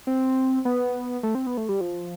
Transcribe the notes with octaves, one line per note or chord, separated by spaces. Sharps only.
C4
B3
A3
C4
B3
A3
G3
F3